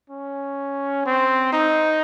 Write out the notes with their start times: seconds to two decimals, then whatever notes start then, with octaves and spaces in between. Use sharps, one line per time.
0.10 C#4
1.06 C4
1.53 D#4